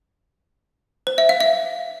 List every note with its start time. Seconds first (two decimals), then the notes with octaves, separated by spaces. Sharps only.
1.07 C5
1.18 E5
1.29 F5
1.40 E5